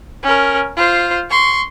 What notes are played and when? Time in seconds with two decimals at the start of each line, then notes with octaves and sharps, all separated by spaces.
0.23 C#4 A#4
0.77 F4 C5
1.30 C6 C#6